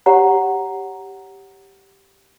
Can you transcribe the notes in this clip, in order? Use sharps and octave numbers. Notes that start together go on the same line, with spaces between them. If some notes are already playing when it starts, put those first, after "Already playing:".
G4 C#5 F#5 A#5